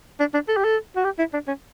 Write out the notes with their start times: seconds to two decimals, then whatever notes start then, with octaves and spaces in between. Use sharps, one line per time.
0.20 D4
0.34 D4
0.48 A4
0.57 G4
0.64 A4
0.96 F#4
1.05 G4
1.19 E4
1.33 D4
1.48 C#4